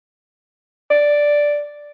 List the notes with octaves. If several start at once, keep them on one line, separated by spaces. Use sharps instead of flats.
D5